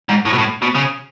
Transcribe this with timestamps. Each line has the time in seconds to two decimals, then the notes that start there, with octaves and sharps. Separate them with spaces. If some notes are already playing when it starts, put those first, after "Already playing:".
0.09 G#2
0.25 A2
0.33 B2
0.38 A2
0.62 B2
0.75 C#3